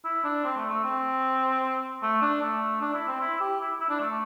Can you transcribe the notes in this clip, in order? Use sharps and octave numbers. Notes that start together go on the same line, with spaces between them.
E4
D4
C4
A3
A3
C4
A3
D4
A3
D4
E4
C4
E4
G4
E4
E4
D4
A3